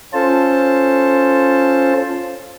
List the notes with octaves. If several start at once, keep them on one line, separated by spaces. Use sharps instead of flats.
C#4 F4 A4 C5 A5